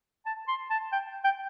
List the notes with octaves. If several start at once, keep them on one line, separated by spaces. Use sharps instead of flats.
A5
C6
A5
G5
G5